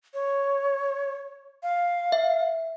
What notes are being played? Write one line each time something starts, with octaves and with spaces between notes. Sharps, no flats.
C#5
F5
E5